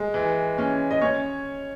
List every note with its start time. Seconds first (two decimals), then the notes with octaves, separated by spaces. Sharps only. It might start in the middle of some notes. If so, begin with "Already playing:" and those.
Already playing: G#3
0.14 E3
0.58 C#4
0.91 D#5
1.02 C#4 C#5